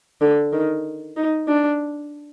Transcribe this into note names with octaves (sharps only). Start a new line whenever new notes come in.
D3
D#3
D#4
D4